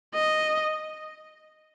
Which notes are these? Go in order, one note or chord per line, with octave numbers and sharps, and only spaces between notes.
D#5